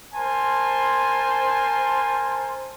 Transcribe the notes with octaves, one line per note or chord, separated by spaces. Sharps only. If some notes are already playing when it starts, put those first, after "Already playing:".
A#4 C5 G#5 A5 C6